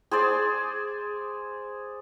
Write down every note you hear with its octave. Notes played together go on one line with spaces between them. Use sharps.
G#4 C5 D5